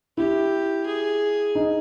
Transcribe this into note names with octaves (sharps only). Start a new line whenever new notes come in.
E4 G4
G#4
D#4